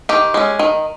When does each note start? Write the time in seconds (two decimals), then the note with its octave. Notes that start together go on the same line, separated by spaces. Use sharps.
0.09 D#3 G4
0.34 G#3 C#4
0.59 D#3